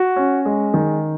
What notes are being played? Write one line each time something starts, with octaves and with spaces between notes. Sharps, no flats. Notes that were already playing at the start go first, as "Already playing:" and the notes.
Already playing: F#4
C#4
G#3
D#3